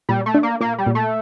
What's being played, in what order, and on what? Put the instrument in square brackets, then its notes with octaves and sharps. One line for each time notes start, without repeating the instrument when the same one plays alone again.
[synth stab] A#2 [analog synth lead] G3
[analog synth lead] A3
[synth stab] D4
[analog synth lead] A#3
[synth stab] A#2 [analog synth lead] A#3
[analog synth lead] G3
[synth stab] A#2
[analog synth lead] A3